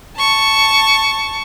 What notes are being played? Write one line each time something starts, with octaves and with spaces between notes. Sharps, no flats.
A5 C#6